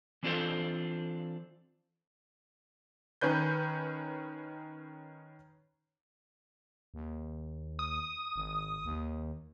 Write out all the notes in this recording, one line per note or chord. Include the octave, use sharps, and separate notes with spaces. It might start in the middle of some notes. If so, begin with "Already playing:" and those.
E3 C4 D4 F4 A4 C5
D#3 C#4 B4 G6
D#2
D#6
G#1
D#2